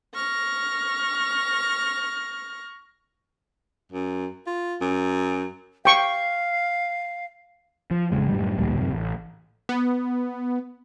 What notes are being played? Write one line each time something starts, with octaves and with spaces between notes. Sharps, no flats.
C#6 F6 A#6
F#2
F4
F#2
F5 G5 C#6
F3
A1 F2 C#3 G#3
F#2 A2 G3
A1 D2 A#2 G3
F#2 C3
A1
B3